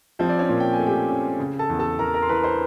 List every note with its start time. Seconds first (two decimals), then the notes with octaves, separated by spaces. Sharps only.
0.19 F3 C4 C5
0.29 D5
0.39 C#4 C#5
0.49 A#2
0.60 G5
0.73 G#5
0.79 A3
0.86 G4 G5
1.10 C#4
1.40 C#3
1.59 A4 A5
1.70 E2
1.79 A4 A5
1.99 E2 A#4 A#5
2.14 A#4 A#5
2.22 C6
2.29 E3 B4 B5
2.43 C5 C6